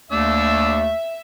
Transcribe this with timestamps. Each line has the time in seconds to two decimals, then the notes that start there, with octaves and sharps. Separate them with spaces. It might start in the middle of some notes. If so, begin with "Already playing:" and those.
0.12 D#2 A3 D4 E5 E6